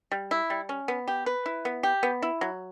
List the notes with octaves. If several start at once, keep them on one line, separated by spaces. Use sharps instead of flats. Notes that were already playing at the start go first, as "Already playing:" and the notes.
G3
E4
G3
C#4
B3
G4
B4
E4
B3
G4
B3
E4
F#3